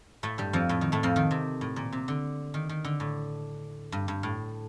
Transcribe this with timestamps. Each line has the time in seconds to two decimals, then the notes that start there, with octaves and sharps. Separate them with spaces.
0.23 A2 A3
0.38 G2 G3
0.53 F2 F3
0.69 A2
0.81 D#3
0.92 A2 A3
1.03 F2 F3
1.16 D#3
1.31 C3
1.61 A2
1.76 A#2
1.92 C3
2.08 D3
2.54 D#3
2.69 D#3
2.84 D3
3.00 A2
3.92 G2
4.08 G2
4.23 A2